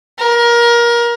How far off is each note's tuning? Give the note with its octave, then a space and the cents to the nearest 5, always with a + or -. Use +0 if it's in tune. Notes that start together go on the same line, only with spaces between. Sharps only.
A#4 +25